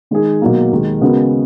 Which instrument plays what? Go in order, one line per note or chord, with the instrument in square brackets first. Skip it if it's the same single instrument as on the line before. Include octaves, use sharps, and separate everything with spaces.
[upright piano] D#3 G#3 D#4 G#4
B2 F#3 A#3
D#2 D#3 G#3
C#3 G#3 B3 F#4 A#4